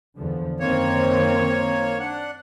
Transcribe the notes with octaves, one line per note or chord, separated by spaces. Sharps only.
E2 D3 F3
F#2 D#3 A#3 C4 C#5
D4 F#5